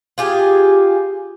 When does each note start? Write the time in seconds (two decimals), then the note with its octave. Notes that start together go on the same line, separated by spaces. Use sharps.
0.18 F4 G4 G#4